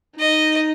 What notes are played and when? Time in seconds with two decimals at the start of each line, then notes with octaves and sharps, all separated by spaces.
0.19 D#4 D#5